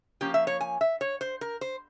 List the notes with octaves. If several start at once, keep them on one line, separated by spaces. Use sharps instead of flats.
F3 A#3 C#4 G4
E5
C#5
G#5
E5
C#5
C5
A#4
C5